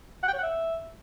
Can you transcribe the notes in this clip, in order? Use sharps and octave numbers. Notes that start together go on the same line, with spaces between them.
F#5
G5
C#5
F#5
E5